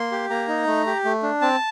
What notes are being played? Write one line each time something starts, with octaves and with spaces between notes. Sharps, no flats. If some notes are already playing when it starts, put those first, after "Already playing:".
Already playing: A#3 C6
G4
A#3 A#5
D#4
A3
G4
A3
D4
C4 A5